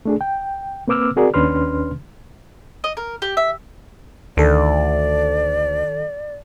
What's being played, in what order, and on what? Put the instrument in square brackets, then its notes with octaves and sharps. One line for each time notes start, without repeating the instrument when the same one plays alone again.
[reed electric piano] A3 D4 G#4
G5
A#3 C4 B4 D6 E6 F6
C4 F#4 G#4 A#4 D5
D#2 C#4 D4 B4 C6 F6
[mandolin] D#5
A#4
G4
E5
[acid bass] D2 [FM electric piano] D#3 A4 [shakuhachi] D5